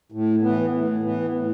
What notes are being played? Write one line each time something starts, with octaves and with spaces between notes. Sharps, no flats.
A2
E3 B3
A2
E3 B3
A2